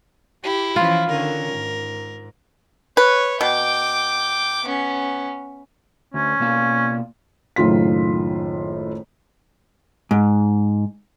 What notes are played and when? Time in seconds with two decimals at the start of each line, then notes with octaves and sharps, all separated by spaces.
0.44 E4 G4
0.76 E3 F3 C#4 F4
1.10 D3 D#3 C#4 A#4
1.52 G#2
2.97 B4 C#5
3.41 B2 G5 D6
4.65 B3 C#4
6.14 D2 C#4
6.40 B2 A#3 F5
7.56 F#1 A2 D#3 F4 C6 B6
10.11 G#2